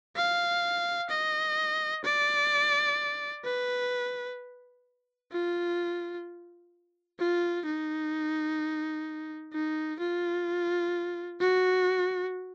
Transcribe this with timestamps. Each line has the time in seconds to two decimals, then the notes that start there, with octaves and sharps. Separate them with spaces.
0.16 F5
1.10 D#5
2.04 D5
3.44 B4
5.32 F4
7.19 F4
7.66 D#4
9.53 D#4
10.00 F4
11.41 F#4